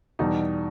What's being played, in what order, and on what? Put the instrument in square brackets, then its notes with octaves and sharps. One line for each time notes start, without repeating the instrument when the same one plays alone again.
[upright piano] E2 B2 G3 D#4